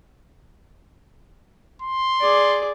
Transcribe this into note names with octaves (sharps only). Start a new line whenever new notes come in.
C6
G#4 D5